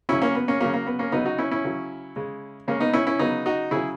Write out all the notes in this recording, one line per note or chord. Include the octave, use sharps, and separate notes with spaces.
C#3 F#3 C#4 E4
A#3 C#4
B3
A#3 C#4
C#3 F#3 A#3 C#4
A#3
B3
A#3 C#4
C#3 F#3 B3 D#4
D#4 F#4
C#4 E4
C#4 E4
C#3 F#3
C#3 G#3
C#3 G#3 A#3 C#4
B3 D#4
C#4 E4
C#4 E4
C#3 F#3 B3 D#4
D#4 F#4
C#3 F#3 E4 G#4